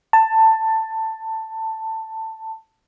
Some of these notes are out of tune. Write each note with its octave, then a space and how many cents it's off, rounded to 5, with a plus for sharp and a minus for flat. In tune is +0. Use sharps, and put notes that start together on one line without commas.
A5 +15